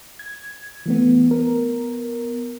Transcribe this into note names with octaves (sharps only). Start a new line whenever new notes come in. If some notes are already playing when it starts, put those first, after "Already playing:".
G#6
E3 A3 B3
B3 A#4